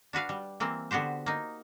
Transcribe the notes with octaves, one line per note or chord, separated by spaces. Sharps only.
D4 F#4 B4 F5
G3
E3 A#3 C4
D3 B3 F#4 G4 C5
A#3 D#4